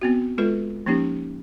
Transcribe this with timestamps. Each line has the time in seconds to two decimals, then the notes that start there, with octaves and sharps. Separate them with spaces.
0.02 B3 C4 F#4
0.38 G#3 F4 A4 B4
0.86 F3 A#3 C#4 D#4 G4